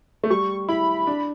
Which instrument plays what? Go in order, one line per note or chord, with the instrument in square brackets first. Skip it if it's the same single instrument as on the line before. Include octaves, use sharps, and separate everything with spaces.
[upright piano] A3
[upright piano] G3 [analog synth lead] C#6
[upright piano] E4 [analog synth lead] B5
[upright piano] D4